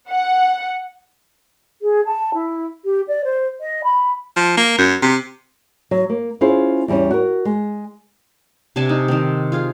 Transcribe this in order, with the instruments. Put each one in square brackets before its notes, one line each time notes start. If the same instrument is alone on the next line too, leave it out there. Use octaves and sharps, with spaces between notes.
[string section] F#5
[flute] G#4
A5
E4
G4
D5
C5
D#5
B5
[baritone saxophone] F3
A#3
F#2
C3
[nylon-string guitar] F#3
A#3
C#4 E4 F4 G#4 C5
E2 G3 C#4
F#4 A#4
G#3
[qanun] C3 D4 G#5 A5
D#4
D#3 C4
F4 G#4 F5